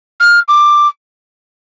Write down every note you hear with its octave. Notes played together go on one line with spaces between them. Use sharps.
F6
D6